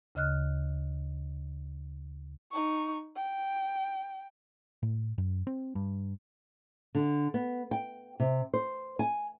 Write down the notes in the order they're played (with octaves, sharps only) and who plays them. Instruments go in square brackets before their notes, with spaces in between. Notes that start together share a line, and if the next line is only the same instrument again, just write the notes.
[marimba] D2 C#3 D#5 F6 F#6
[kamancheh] D#4 C#6
G5
[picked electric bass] A2
F#2
C4
G2
[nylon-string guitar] D3
B3
G5
C3
C5
G#5